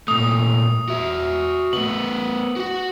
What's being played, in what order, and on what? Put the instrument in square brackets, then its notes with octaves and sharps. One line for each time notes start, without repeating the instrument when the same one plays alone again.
[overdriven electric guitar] A#2 A3 [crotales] D#6
[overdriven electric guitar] F#4 E5
[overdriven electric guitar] A3 B3 [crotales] F#7
[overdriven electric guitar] F#4 F#5